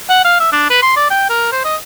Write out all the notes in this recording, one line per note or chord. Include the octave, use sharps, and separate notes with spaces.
F#5
F5
E5
D4
B4
C6
D5
G5
A#4
C5
D#5